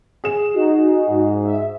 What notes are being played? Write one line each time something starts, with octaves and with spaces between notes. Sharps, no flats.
G#4 E7
D#4 F#4
G#2
E5